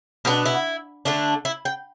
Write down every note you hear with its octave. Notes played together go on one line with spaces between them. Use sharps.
B2 B3 D4 G4
E4
D3 A3 D4
E4
G5